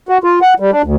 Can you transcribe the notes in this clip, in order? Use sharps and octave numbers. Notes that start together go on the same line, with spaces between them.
F#4
F4
F#5
G3
D4
D2